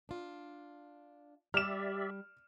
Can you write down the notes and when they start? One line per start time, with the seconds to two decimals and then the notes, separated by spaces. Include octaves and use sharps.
0.09 D4 F4
1.54 G3 G4 D5 E5 F6 E7